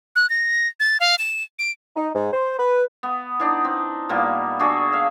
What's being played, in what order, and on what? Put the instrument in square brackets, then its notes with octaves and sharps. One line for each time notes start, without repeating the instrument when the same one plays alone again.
[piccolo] F#6
A#6
A6
F5
E7
D7
[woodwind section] D#4
G#2
C5
B4
[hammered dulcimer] B3
E3 D4 D#4
C4
A#2 G3 A#3 B3
D4 F#4 G#4 E5
E5 F5